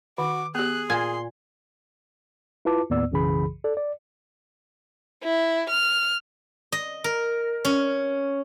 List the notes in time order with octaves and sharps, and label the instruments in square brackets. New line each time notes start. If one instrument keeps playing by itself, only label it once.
[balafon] D#3 [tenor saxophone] F#4 [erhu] D6
[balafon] B3 G4 [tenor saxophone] G#4 [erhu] F#6
[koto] A#2 G#5 [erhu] C6
[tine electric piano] E4 F4 B4 A5 D6
D#2 A2 B3 D5 E6
B1 F#2 C#3 E3 G#4 B5
A4 D5
D5
[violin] E4
F6
[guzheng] D#5
A#4
C#4